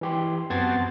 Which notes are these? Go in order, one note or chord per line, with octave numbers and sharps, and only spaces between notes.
E3 G4 C6
F#2 B3 C4 A5 G#6